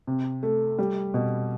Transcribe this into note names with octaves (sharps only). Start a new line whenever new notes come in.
C3
A3
G3
B2